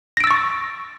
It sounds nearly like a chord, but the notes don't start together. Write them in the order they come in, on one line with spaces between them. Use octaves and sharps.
A#6 D7 E6 A6 C#6